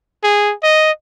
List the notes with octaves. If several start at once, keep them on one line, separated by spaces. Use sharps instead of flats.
G#4
D#5